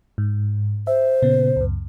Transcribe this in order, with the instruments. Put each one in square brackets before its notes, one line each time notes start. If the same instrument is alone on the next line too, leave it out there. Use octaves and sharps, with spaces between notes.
[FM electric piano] G#2
[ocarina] C5 [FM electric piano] E5
[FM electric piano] A#2 C#3 B3
C#2 F#2